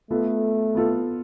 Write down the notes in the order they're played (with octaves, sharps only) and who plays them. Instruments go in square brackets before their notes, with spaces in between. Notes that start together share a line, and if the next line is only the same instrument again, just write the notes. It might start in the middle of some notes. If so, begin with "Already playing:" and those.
[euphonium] A3 [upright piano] B3 F4 A4
[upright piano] B3 F4 A4